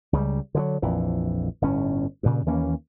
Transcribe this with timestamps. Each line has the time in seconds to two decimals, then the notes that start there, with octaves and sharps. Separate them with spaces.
0.13 C#2 C#3 F#3 G3
0.55 D3 D#3 F#3
0.82 A#1 F2 E3
1.62 G1 A2 C#4
2.23 G2 A#2 C#3
2.46 D#2 E3 A#3 C#4